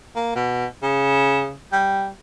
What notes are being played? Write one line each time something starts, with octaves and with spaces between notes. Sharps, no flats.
A#3
B2
C#3
G3